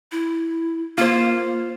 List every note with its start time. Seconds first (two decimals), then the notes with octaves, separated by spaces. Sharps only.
0.12 E4
0.98 A#3 F4 C5